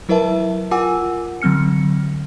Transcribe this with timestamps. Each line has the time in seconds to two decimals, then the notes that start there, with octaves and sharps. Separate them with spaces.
0.09 F#3 E4 A#4 B4 E5 A5
0.71 F4 A#4 F#5 G#5 D6 E6
1.42 D3 F#3 C4 F6 C#7